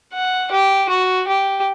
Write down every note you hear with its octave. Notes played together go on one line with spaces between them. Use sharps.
F#5
G4
F#4
G4